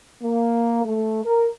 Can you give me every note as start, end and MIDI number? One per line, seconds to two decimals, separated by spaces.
0.23 0.83 58
0.84 1.21 57
1.23 1.47 70